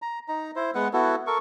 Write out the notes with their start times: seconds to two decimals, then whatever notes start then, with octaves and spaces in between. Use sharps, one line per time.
0.02 A#5
0.28 D#4 A#5
0.56 E4 C5
0.75 G#3 B3 B4 F#5
0.93 B3 E4 F#4 A4
1.27 A4 A#4 C#6